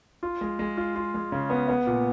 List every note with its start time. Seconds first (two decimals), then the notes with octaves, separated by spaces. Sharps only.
0.23 F4
0.41 G#3
0.59 G#3
0.77 F4
0.96 F4
1.14 G#3
1.32 C#3
1.50 B3
1.68 B3
1.87 A#2